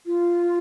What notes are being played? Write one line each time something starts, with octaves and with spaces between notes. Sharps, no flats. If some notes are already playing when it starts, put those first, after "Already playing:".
F4